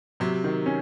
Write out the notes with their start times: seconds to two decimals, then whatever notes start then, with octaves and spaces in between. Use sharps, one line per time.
0.20 C3 F#3
0.44 D#3
0.66 C#4